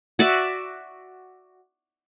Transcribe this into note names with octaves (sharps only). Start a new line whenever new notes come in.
F#4 D5 E5